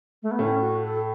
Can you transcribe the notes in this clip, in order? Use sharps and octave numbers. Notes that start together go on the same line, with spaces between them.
A3
B3
A2 A3 C#4
F#4
A4